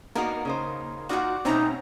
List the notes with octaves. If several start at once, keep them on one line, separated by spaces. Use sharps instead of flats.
A#3 B3 D#4 F#4 A#4
C#3 D#4 C5
A#3 D#4 F4 F#4 D5 F#5
B2 A3 C4 C#4 D#4 A#5